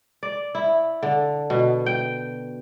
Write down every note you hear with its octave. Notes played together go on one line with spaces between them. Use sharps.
D5
E4
D3
B2
G5